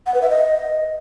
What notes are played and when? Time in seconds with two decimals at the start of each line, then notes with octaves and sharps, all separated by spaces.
0.07 F#5
0.14 B4
0.22 E5
0.30 D#5